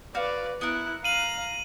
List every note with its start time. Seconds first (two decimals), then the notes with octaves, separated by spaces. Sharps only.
0.15 F#4 B4 D5 F5
0.61 B3 E4 A#4 F#6
1.04 F5 A#5 D#7 F#7